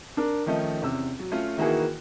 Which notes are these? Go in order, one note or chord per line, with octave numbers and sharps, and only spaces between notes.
D4 A#4
D#3 F3 A3 C#4 D#4
E2 C3 C#4 E6
F#3
A3 C#4 F4
D#3 E3 A#3 E4 F#4 G#4